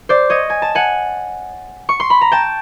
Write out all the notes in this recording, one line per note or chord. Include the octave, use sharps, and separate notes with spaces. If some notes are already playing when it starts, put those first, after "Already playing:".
C5 D5
C#5 D#5
G#5
A5
F#5 G#5
C#6
C6
B5
A#5
G5 A5